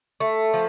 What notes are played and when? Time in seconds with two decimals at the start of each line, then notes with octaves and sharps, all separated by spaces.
0.20 A3
0.53 F3